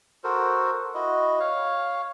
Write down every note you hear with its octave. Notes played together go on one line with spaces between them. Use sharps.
F#4 A4 A#4 C5
E4 F#4 D#5
C#5 F5